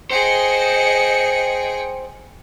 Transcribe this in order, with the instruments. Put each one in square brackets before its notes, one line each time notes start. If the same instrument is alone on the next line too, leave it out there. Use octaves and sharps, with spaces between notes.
[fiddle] G#4 G5 [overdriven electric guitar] C5 [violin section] D#5 C#7